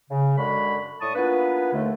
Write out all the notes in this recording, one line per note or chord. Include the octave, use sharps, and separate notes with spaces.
C#3
F#2 D3 G#3 F#4 B5
A2 D5 A5 C#6 D#6
A#3 B3 D4 E4 F4 B4
D#2 D3 A3